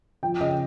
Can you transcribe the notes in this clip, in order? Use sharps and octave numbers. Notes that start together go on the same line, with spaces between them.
F3 G5
C#3 D#5